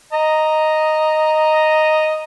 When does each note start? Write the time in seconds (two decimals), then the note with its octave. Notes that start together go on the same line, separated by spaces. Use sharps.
0.13 D#5 A#5